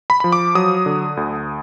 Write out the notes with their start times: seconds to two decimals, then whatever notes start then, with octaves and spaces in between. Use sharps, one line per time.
0.10 B5
0.20 F3 B5
0.32 D6
0.55 F#3 D#6
0.86 D3
1.17 D2